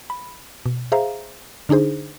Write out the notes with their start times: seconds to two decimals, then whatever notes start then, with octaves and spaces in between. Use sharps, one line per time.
0.10 B5
0.66 B2
0.92 G#4 C5 E5 F5 A#5
1.69 D3 D4 D#4 G#4 C5